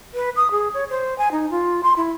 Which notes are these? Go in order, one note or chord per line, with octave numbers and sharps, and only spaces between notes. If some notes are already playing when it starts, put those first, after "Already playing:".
B4
D#6
G#4
C#5
C5
G#5
D#4
F4
C6
E4